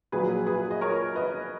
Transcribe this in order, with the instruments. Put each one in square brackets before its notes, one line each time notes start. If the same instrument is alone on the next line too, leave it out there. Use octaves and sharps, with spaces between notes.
[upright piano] A#1 A#2 F#3 G#4 B4
G#4 B4
D#5
A#4 C#5
B4 D#5